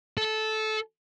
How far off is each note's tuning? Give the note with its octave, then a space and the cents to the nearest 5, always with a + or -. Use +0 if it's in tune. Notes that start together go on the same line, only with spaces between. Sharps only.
A4 -15